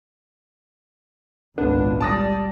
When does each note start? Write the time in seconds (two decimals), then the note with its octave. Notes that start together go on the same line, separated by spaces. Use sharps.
1.58 G#1 C#2 A#2 B3 D4
2.00 G3 D5 A5 D#6 A#6